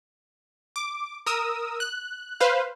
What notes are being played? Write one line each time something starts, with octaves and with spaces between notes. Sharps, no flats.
D6
A#4 D#6 E6
F#6
B4 C5 F5